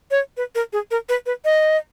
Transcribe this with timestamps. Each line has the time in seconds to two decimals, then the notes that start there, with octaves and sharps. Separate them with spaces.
0.11 C#5
0.37 B4
0.55 A#4
0.73 G#4
0.91 A#4
1.09 B4
1.26 B4
1.45 D#5